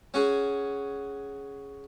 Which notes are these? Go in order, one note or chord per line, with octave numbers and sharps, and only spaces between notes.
C#4 F#4 G#4